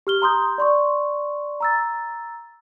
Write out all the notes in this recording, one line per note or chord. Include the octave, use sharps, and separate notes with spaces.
G4 F6 G7
A#5 C6 D#6 G6
D5 C6 C#6
A#5 E6 A6